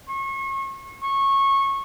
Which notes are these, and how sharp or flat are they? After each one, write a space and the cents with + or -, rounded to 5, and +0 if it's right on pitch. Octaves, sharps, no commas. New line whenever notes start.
C#6 -35
C#6 -20